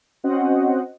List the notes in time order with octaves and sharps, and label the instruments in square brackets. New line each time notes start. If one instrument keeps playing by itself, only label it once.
[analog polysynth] C4 C#4 F#4 C5 D#5 F#5